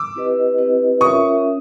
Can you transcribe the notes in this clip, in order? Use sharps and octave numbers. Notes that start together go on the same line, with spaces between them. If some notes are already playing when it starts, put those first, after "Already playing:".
Already playing: D6 E6
C4 E4 G4 B4 D#5
C4 E4 G4 B4 D#5
C#4 F4 A#4 C#5 E5 C#6 D#6
C#4